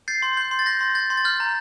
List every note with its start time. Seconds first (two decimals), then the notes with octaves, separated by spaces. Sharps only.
0.08 G6 A6 C7
0.22 C6
0.37 G6
0.51 C6
0.59 A6
0.66 G6 A#6
0.81 C6
0.95 G6 A6
1.10 C6
1.17 A6
1.25 F6 G6
1.40 A#5